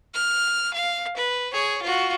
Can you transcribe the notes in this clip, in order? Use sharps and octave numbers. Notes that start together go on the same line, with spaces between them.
F6
F5
B4
G#4 C#5
F4 F#4